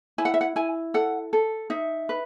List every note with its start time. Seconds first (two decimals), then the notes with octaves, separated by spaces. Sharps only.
0.18 E4 G#5
0.25 F#5
0.34 E5
0.41 F#5
0.56 E4 G#5
0.94 A4 F#5
1.33 A4
1.70 D#4 E5
2.09 B4